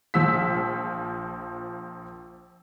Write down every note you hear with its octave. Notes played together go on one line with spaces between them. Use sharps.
A#1 F3 E6 B6